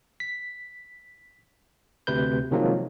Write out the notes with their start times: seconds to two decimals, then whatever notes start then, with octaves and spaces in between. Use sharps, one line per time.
0.20 B6
2.07 D2 C3 B4 G6
2.51 C3 D#3 F3 F#3 G#3 A#3